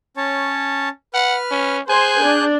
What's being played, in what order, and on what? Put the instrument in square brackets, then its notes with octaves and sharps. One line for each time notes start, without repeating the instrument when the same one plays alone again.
[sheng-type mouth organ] C#4 C#5 A5
[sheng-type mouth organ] B4 F6 [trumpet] F#5
[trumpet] C#4
[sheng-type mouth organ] G#4 F#6 G6 [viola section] C5 [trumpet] G#5
[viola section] D4